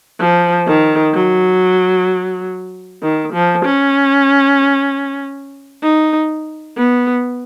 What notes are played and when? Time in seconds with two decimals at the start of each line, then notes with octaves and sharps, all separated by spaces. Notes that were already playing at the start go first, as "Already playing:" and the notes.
0.20 F3
0.67 D#3
1.14 F#3
3.03 D#3
3.33 F3
3.65 C#4
5.83 D#4
6.77 B3